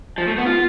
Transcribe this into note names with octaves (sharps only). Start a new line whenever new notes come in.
F3
A3
B3
F4